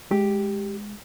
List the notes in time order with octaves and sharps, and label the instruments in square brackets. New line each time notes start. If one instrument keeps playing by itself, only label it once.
[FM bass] G#3 [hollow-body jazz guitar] G4